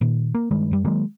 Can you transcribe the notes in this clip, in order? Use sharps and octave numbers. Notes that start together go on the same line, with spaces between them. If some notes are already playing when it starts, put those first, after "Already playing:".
A#2 D#3
A#3
G2 D#3 G#3
F#2 G3
D#3 F#3 G#3 A#3